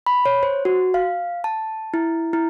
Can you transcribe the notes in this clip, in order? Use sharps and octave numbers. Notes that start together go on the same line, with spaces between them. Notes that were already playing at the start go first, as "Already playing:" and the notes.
B5
C#5
C5
F#4
F5
A5
E4
E4